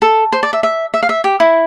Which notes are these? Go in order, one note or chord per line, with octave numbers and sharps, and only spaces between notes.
A4
C5
D5
E5
E5
E5
F5
E5
G4
E4